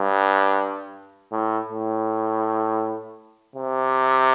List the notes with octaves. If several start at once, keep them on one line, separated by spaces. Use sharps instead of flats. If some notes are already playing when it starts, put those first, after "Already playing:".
Already playing: G2
A2
A2
C3